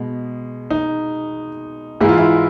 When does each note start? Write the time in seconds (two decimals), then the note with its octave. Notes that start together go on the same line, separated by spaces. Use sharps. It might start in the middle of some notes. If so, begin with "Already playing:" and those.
Already playing: B2 G#3
0.71 D#4
2.00 G#2 E3 G#3 E4
2.09 F4
2.18 E4